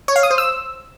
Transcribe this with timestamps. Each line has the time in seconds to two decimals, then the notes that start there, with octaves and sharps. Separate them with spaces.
0.08 C#5
0.16 F5
0.23 D#6
0.31 C5
0.38 E6